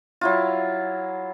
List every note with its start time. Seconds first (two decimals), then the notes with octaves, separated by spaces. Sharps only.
0.21 F#3 E4 F4